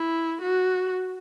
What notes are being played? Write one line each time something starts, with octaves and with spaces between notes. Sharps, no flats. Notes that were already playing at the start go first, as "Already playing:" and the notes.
Already playing: E4
F#4